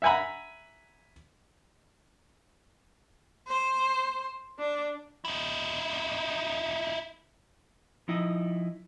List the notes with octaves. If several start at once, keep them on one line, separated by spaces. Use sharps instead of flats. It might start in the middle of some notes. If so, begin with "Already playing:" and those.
E5 F#5 G#5 A#5 B5
C5
D4
D#4 E4
F3 D#4 E4 D#5